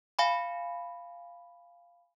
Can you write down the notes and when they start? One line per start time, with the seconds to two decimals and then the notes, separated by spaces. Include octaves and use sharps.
0.19 F5 G#5 B5